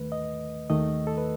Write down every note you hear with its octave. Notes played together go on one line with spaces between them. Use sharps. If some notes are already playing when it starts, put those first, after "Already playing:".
Already playing: D#2 D#3 A3 B4
D#5
D#2 D#3 A3 D#5
A4
B4